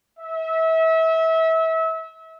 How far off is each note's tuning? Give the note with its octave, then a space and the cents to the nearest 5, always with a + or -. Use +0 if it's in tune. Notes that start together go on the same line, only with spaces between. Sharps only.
E5 -30